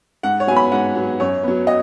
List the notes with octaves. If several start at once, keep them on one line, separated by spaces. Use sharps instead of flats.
G#2 F#5
C#5
F#3 B3 G#5
B5
G#2 F#5
F#3 B3
F#2 C#5
F#3 B3
D#5